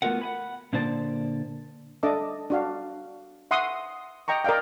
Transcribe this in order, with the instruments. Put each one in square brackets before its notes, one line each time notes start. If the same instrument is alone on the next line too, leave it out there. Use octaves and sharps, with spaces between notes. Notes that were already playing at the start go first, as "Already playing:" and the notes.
[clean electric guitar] A3 B3 F4 F#4 A#4 F#5
F#5 G#5 B5
A#2 D3 A#3 C5 D5 A5
[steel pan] D4 A4 D#5 E5 A5 D6
D4 F#4 F5
E5 F#5 C6 C#6 D#6
D#5 G5 A#5 C#6
A#4 D5 D#5 F5 G5